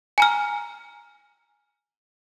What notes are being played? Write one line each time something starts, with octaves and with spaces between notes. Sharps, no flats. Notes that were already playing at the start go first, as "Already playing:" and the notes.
G#5 A#5 F6